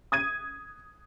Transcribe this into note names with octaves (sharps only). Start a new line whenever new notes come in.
D#6 G#6 D#7